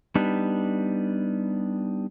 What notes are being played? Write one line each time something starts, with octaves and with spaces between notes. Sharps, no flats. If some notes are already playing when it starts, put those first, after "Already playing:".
G3 B3 D4 D#4